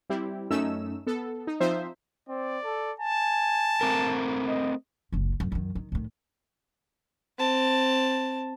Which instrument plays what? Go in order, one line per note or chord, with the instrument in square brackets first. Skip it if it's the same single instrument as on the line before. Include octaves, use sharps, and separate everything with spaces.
[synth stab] G3 C4 E4 G4
F#2 A3 C#4 D#4 E6 E7
B3 A4
D#4
F3 C4 D#4 F4 C5 E5
[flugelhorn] C4 [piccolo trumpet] D5
[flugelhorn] A4
[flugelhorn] G#5 [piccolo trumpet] A5
[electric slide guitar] A3 C4 A#4
[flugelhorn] D#5
[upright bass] F#1 C#2
F#2
F#2 D#3
D#3
A2 D#3
[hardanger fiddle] C4 A5